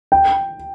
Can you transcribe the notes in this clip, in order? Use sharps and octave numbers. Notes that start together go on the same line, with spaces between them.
G5